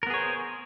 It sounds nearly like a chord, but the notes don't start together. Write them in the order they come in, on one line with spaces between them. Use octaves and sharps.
A#4 B3 G#4 C#5 C5